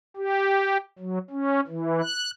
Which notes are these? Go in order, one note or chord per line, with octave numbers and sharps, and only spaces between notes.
G4
F#3
C#4
E3
F#6